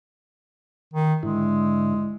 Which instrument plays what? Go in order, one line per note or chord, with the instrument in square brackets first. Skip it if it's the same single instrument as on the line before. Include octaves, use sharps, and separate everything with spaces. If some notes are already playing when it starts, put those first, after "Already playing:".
[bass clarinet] D#3
[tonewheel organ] G#2 D3 E4 [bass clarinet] G#3